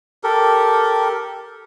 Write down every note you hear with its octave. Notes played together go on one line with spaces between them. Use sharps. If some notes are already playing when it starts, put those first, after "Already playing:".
G4 A4 A#4